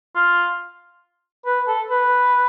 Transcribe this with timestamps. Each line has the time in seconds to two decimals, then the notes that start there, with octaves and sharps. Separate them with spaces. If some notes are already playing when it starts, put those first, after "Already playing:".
0.15 F4
1.46 B4
1.68 A4
1.90 B4